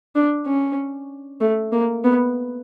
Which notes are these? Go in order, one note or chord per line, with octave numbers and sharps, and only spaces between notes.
D4
C#4
A3
A#3
B3